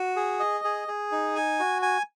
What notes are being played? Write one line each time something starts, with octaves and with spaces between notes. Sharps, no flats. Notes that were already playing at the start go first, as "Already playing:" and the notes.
Already playing: F#4
G#4
D#5
G#4
G#4
D#4
G#5
F#4
G#5